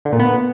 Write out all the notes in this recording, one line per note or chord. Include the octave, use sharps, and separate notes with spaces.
D3
A#2
B3